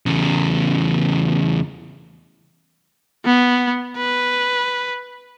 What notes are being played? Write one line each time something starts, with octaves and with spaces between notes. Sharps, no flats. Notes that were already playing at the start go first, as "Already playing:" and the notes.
E2 C#3
B3
B4